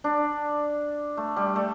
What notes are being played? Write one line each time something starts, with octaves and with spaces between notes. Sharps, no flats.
D4
A3
G3
A3